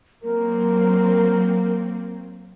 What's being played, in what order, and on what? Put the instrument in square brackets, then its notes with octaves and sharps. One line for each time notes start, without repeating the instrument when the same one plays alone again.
[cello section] F#3 A#3 C4 [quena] A#4